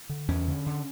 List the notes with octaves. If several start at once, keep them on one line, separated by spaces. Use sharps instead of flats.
D3
E2 C#4
D3
D3